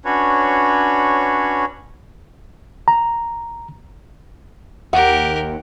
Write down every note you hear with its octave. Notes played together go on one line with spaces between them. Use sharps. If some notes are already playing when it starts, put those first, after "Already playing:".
C#4 D4 F#4 B4 C#5
A#5
D#2 G4 A#4 F#5